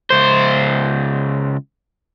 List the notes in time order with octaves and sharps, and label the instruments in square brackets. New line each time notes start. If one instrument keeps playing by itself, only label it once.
[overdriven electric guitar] C#2 C5